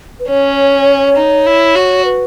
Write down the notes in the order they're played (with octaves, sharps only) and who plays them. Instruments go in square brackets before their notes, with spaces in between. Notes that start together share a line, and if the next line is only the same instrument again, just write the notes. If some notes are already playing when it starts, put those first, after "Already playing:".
[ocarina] B4
[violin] C#4 [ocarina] C#5
[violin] D#4
E4
F#4
[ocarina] B4